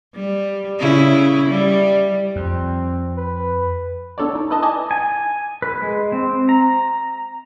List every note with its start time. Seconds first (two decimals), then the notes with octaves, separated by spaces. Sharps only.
0.15 G3
0.79 C#3 E4
1.49 G3
2.36 F2 C4
3.17 B4
4.18 B3 D4 A4 C#5 D5
4.35 D#4
4.50 E4 B4 D#5 A5
4.62 D5 D#5 G#5 A5
4.91 G#5
5.62 B4
5.82 G#3
6.12 C4
6.49 A#5